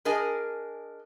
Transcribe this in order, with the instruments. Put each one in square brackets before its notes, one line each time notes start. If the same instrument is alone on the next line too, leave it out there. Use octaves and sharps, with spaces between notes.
[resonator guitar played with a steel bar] D4 G#4 A#4 D#5 G#5